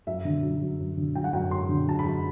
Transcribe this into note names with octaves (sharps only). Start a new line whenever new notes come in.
F#2 E5
D3
F#3
F#2
F#2
D3
F#3 G5
F#5
F#2 G5
F#2 C6
D3
F#3 A5
B5
F#2